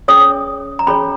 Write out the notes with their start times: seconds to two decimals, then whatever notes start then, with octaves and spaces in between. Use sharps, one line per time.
0.08 C#4 G#4 C#5 D#6
0.79 A#5
0.87 C#4 G#4 C#5 B5